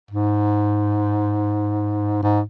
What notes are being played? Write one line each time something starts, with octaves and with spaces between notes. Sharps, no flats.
G#2
G#2